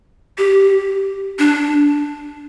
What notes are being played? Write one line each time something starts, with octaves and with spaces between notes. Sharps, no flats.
G4
D4